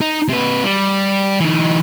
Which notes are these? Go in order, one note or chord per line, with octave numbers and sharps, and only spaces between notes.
D#4
C3 B4
G3
E3 D#4